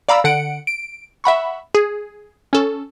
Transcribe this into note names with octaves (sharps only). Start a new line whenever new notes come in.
D5 F5 A#5 B5 E6
D3 F#5 C#7 D7
D7
E5 F#5 B5 C#6
G#4
C#4 A4